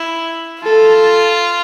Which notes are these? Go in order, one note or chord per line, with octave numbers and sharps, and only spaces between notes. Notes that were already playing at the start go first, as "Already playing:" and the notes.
Already playing: E4
F4 A4